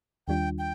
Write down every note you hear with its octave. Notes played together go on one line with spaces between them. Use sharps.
D#2 D#3 G3 D4 F4 G5
G5